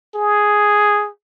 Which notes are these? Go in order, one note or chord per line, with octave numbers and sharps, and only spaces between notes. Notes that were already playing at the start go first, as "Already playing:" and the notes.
G#4